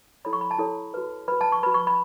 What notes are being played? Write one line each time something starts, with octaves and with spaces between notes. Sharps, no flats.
E4 A4 C#5 B5
C#6
B5
A5
E4 A4 C#5
F#4 B4
F#4 B4 B5
A5
C#6
F#4 B4 B5
C#6
B5